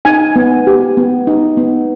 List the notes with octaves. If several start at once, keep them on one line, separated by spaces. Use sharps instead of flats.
D#4 G#5
B3
G4
B3
D#4
B3